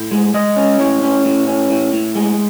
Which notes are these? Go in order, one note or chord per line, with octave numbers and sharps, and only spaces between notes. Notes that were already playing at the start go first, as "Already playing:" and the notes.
Already playing: A2
G#3
G#3 D#5
C#4
A2 C#5
C#4
A2
C#4
A2
A2
G#3